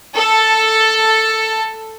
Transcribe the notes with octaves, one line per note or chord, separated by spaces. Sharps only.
A4